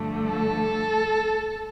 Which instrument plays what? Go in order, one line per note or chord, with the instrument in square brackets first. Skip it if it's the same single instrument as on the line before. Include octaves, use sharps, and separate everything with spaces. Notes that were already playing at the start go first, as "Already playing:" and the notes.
Already playing: [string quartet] G2 D3 F3 A3
A4